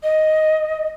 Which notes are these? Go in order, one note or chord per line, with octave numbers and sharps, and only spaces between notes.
D#5